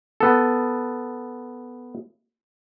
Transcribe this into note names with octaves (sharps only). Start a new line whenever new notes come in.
B3 A4